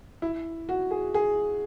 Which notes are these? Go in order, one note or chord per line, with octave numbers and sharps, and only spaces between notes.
E4
F#4
G#4
G#4